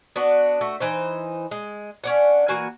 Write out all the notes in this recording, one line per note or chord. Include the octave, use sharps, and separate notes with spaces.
B3 D4 F#4
A3 F#4
E3 D#4 C5
G#3
C#4 D4 F#5
E3 A#3 F#4 G#5